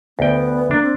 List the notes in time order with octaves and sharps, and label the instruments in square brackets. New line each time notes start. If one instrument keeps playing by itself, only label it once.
[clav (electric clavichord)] D2 G5 [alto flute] B3
[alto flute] A#3 [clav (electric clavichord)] D4
[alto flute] C4